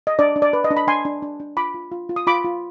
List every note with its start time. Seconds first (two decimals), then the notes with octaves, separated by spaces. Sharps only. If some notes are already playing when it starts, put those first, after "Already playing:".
0.07 D#5
0.19 D4 D5
0.36 D4
0.42 D5
0.53 B4
0.64 D#5
0.71 D4
0.77 B5
0.87 D4 G#5 C6
1.05 D4
1.22 D4
1.40 D4
1.57 F4 B5 D6
1.74 F4
1.92 F4
2.09 F4
2.16 D#6
2.27 F4 B5 D6
2.45 F4